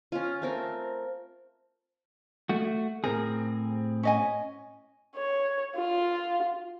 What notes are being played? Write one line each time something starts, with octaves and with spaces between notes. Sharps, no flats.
C#4 F4
A3 C4 A#4
A3 F#4
A2 C4 G#4 A#4
C#4 D#5 G#5
C#5
F4